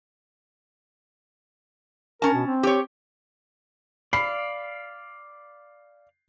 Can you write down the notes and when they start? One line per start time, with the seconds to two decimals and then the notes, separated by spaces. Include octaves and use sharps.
2.22 C#4 A#4 A5
2.34 B2
2.47 C4
2.63 G4 C#5
4.13 D5 F5 B5 C7